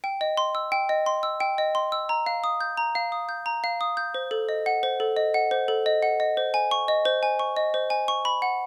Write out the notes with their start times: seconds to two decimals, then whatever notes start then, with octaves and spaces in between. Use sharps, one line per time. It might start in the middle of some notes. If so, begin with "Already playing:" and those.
0.04 G5
0.21 D#5
0.37 C6
0.55 E6
0.72 G5
0.89 D#5
1.06 C6
1.23 E6
1.40 G5
1.58 D#5
1.75 C6
1.92 E6
2.09 A#5
2.26 F5
2.44 D#6
2.61 G6
2.77 A#5
2.95 F5
3.12 D#6
3.29 G6
3.46 A#5
3.64 F5
3.81 D#6
3.97 G6
4.14 C5
4.31 A4
4.49 D#5
4.66 F#5
4.83 C5
5.00 A4
5.16 D#5
5.34 F#5
5.51 C5
5.68 A4
5.86 D#5
6.03 F#5
6.20 D#5
6.37 C5
6.54 G#5
6.71 C#6
6.88 D#5
7.05 C5
7.23 G#5
7.39 C#6
7.56 D#5
7.74 C5
7.90 G#5
8.08 C#6
8.25 B5
8.42 F#5